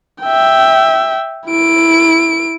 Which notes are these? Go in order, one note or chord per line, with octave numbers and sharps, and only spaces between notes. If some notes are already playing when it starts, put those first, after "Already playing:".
E5 G5
E4 D7